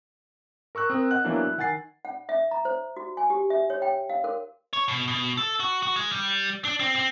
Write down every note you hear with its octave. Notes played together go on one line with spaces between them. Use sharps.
A#4 C#6 E6 F#6
C4 A#4 D#6
D#5 F#5 F#6
E3 F#3 A#3 B3 D4
E4
D#3 F#5 G#5 A6 C7
F#5
E5
A#5
C5
F#4
G#5
G4
E5
C#5
G5
F5
A#4
C#5
B2
B2
A4
F#4
F#4
G#3
G3
D4
C4
C4